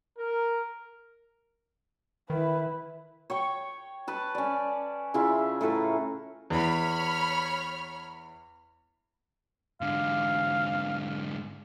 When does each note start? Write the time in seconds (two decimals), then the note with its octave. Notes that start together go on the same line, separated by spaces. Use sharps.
0.18 A#4
2.30 D#3 E4 B4
3.30 C#5 G5 C#6
4.08 B4 A5
4.35 C#4 D5
5.14 C#3 E4 F4 E5
5.61 A2 A4 B4 A#5
6.50 E2 C#5 B5 F6
9.81 G#2 D3 F5